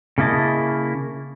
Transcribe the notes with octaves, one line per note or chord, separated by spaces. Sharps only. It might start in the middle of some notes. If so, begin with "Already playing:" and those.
C#3 A#3 E4 D#5 A5